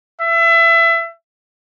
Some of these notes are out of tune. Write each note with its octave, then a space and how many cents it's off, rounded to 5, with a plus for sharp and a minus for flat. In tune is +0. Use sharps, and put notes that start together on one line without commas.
E5 +25